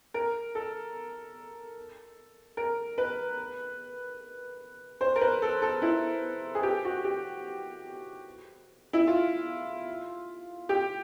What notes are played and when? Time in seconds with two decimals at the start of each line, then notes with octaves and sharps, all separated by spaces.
0.14 A#4
0.55 A4
2.57 A#4
2.98 B4
5.01 C5
5.16 A#4
5.21 B4
5.42 A4
5.62 A4
5.82 E4
6.55 G#4
6.63 G4
6.85 F#4
7.05 G4
8.93 E4
9.07 F4
10.69 G4